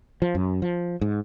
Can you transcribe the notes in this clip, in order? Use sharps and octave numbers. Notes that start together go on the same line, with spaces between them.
F3
F#2
F3
G#2